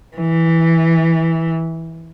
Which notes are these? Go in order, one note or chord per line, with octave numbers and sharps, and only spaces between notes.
E3